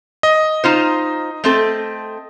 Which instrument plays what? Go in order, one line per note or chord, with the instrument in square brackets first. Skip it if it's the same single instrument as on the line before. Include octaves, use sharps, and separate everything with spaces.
[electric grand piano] D#5
[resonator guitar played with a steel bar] D#4 F4 C5
A3 C4 A4